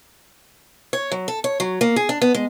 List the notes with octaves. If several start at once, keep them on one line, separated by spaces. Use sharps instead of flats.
C#5
F#3
A4
C#5
F#3
A#3
G#4
D4
B3
G#3